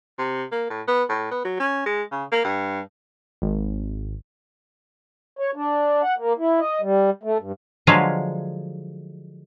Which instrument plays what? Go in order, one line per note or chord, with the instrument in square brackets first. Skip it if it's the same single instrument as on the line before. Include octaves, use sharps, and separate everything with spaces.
[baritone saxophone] C3
A#3
A2
B3
A2
B3
F#3
C#4
G#3
C#3
A#3
G2
[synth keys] G#1
[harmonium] C#5
D4
F#5
A#3
E4
D#5
G3
A3
G2
[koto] D3 F3 F#3 G#3 B4 F5